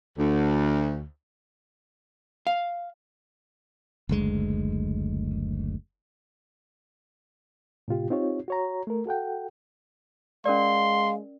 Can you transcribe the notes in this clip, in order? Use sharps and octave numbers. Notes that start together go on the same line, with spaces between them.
D2
F5
F#1 D2 G#3
A2 C3 F4 G4
C4 D#4 F4 G4 C#5
F#4 C#5 A#5
A3 A#4
F#4 A4 F#5 G5
G#3 C#4 A#4 D5 F5 C6